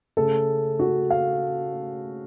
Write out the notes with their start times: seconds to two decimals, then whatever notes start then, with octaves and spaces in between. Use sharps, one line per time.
0.17 C#3 A3 A4
0.79 F#4
1.10 F5